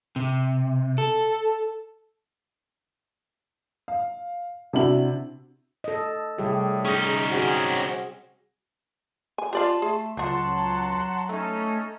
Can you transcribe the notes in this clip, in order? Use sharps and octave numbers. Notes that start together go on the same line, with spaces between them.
C3
A4
F5
C3 D4 E4 F#4 F#7
A4 D#5
A2 C3 G3 G4 G#4
C#4 D#4
C4 F#4 G#4 F#5
G#5
F4 G4 D5 F5 A5 C6
A3 G#4
C#2 F3 F#3 F4 F#5 A5 C6
A3 C#4 D#4 A4